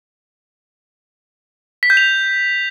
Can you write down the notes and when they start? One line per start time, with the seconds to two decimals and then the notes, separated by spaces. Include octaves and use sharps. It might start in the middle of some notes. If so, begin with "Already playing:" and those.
1.83 B6
1.90 G6
1.97 F7